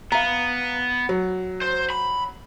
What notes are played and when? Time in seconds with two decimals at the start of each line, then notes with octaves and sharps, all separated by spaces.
0.12 B3 F5 A#5
1.09 F#3
1.62 C5
1.90 B5